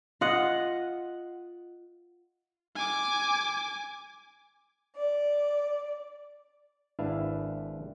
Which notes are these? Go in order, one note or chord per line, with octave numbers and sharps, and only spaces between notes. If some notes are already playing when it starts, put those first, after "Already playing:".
F4 D#5 F#5
G#5 D6
D5
G#1 D4 E4 B4 E5 F5